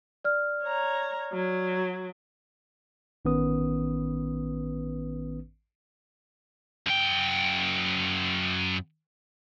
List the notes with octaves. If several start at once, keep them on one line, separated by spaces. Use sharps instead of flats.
D5 F6
C#5 A#5
F#3
A1 D#3 B3 C#4 B4 D#6
F#2 G5